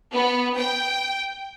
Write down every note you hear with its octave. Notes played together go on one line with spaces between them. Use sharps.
B3
G5